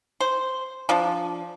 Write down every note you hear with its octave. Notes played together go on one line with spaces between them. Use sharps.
C5
F3 D4